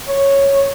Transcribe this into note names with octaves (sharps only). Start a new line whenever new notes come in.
C#5